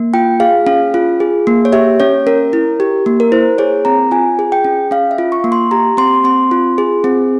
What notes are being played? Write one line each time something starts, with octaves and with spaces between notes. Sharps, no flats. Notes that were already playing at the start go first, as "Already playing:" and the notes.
Already playing: A#3
F4 G5
G#4 F5
C#4 F5
F4
G#4
A#3
C#5
G4 E5
C#4 C#5
C#4 A#4
E4
G4
A#3
A#4
E4 C5
G#4 C#5
C4 A#5
F4 G#5
G#4
G5
C#4
C#4 F5
E5
F4
C#6
A#3
C6
G4 A#5
C4 C6
C4 C6
F4
G#4
C4